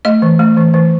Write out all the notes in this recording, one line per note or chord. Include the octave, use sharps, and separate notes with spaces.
A3 D#5
E3
A3
E3
E3